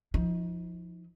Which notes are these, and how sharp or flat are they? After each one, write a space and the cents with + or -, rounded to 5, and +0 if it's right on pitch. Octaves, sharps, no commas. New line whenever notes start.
F3 +0 D#4 +35